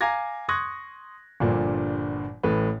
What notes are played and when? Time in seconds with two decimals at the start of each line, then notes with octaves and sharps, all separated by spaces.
0.01 F5 G#5 A#5 D6 G#6 A#6
0.49 C6 C#6 D#6 F#6 G#6 A#6
1.40 G1 G2 A#2 F3
2.43 A1 A2 B4